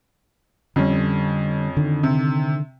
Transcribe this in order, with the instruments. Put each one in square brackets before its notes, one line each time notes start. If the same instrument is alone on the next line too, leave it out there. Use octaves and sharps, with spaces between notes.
[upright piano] F2 C#4 [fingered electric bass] D3 G3
[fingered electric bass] D3 D#3
[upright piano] C3